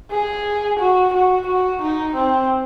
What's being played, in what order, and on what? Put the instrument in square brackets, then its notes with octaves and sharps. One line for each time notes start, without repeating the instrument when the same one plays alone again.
[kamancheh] G#4
F#4
F#4
F#4
D#4
C4